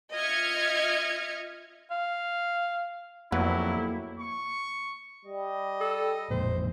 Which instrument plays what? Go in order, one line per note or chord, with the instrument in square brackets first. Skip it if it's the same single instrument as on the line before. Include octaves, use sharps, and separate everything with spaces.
[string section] F4 D#5 E5 F6 G#6 C#7
[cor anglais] F5
[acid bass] F2 [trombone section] F#3 G3 E4 [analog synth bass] A#3 [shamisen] B3
[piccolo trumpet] C#6
[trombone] G3 [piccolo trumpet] D#5
[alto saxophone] A4
[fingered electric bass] A1 F2 A#2 [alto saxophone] C5